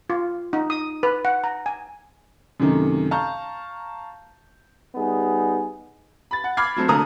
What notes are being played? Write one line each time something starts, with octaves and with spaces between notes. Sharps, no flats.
F4
D#4
D#6
B4
F#5
A#5
G#5
F#2 C3 D#3 A3
F5 A5 A#5 C#6 F6 G6
G3 B3 D#4 G#4
B5 A6
F#5
B5 D6 F6 G#6 C7
F#3 A3 C4
D3 A3 A#3 A#5 D#6